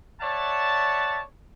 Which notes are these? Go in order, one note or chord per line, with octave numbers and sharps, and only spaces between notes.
C#5 D5 E5 F#5 A5